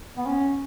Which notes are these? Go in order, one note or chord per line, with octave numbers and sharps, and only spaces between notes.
B3
C#4